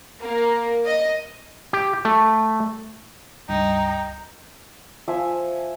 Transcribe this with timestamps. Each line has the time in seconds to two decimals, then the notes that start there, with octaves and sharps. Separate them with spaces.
0.22 A#3
0.86 D#5
1.73 G4
2.05 A3
3.49 C#2 G2 D#4 G5
5.08 F3 E5 G#5